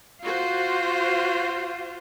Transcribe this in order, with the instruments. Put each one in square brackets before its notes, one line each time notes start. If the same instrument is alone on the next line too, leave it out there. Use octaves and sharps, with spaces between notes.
[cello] F4 [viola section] F#4 C5